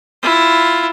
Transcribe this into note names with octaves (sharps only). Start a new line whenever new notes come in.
E4 F4